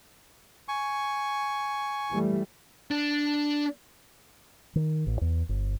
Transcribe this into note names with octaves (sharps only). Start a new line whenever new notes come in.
G#5 C#6
E3 G3 A3
D4
D#3
A1
E2
G1